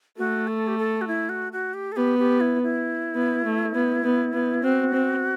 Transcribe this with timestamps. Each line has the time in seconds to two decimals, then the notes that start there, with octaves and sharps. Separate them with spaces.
0.18 A3 F#4
0.47 A4
0.68 G4
0.78 A4
1.01 F#4
1.07 E4
1.29 F#4
1.53 F#4
1.74 G4
1.92 A4
1.96 B3 G4
2.19 G4
2.40 E4
2.63 E4
3.15 B3
3.45 A3
3.75 B3
4.04 B3
4.34 B3
4.63 C4 F#4
4.94 C4